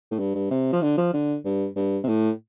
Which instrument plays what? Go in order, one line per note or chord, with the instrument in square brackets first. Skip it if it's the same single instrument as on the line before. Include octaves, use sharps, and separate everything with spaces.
[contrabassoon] A2
G2
G2
C3
F3
D3
F3
D3
G2
G2
C3
A2